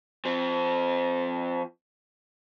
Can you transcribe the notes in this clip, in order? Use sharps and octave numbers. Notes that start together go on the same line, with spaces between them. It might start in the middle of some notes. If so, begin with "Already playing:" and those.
F3 C4